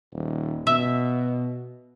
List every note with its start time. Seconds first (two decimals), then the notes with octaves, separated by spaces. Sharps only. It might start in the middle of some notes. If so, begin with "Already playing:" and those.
0.13 D#1
0.67 B2 E5